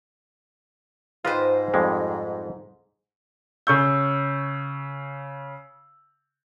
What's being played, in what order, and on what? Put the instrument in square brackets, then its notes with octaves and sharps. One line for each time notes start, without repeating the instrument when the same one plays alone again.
[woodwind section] G#2 [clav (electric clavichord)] F4 B4 G5 [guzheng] C5 D#5
[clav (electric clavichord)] F2 G3 G#3
[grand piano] C#3 C#6 G6 [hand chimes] E6